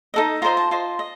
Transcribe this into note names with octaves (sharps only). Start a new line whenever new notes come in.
D#4 A4 D#5
F4 C5 D#5 A#5
A5
F4 C5 D#5
D#5